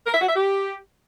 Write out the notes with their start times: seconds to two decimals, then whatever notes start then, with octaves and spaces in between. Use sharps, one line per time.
0.07 A#4
0.14 E5
0.21 F#4
0.29 E5
0.36 G4